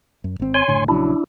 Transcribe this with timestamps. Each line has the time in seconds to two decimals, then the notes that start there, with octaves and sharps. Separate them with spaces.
0.24 F#2
0.40 G#1 C4
0.54 C#5 G#5 C6
0.68 F#1 A2 D3
0.88 A#1 C#3 F#3 D4 E4